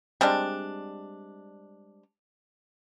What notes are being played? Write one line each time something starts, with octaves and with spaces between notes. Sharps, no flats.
G3 G#3 C4 D4